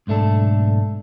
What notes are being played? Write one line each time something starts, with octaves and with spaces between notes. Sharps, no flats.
B1 G#2 A3 D4 A4